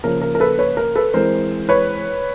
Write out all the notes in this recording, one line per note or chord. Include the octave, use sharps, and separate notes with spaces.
C#3 F3 A#3 A#4
A#4
A#4
A4 B4
B4 C#5
A#4
A4 B4
E3 G#3 C4 A#4 C5
B4 C#5